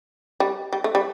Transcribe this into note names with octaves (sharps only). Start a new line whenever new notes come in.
G3
G3
A3
G3